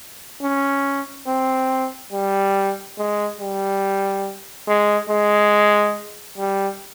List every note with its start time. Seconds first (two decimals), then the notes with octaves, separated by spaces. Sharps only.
0.42 C#4
1.27 C4
2.12 G3
2.98 G#3
3.40 G3
4.68 G#3
5.10 G#3
6.38 G3